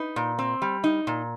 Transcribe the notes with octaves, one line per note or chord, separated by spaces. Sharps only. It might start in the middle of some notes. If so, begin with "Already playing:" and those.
Already playing: D#4 B4
A#2
C4
G3
D#4
A#2